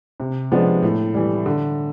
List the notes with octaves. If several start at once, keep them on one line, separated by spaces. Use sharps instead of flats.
C3
F3 G#3 B3 D4
A2
E3 G3
D3